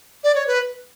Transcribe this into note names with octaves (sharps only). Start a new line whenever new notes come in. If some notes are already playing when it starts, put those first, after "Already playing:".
D5
C#5
B4